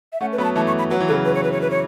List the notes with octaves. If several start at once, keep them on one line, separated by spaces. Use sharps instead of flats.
E5
A3 C#4 F#5
B4
F#3 B3 B5
A5
E3 A3 A5
C#6
B5
F#3 B4
E3
C#3 F#3 A4
B4
C#5
B4
C#5
B4
C#5